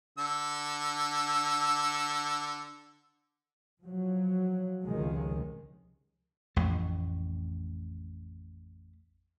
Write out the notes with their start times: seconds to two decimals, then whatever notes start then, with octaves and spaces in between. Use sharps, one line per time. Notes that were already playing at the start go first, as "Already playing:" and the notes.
0.18 D3 E6
3.83 F3 F#3
4.86 F1 C#2 C3 D#3 F3 G#3
6.56 A1 F2 A3